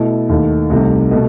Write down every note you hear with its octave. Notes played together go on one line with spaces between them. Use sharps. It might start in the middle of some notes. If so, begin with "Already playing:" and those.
Already playing: B2 A3 E4
D#2 D#3 A3
C2 C3 D#3 A3
B2 A3